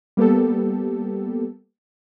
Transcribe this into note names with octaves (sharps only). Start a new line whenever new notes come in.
G3 A#3 B3 G4 A4